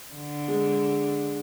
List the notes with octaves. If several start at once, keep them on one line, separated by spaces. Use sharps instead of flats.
D3
G#3